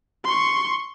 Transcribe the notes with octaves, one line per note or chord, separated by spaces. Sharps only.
C6 C#6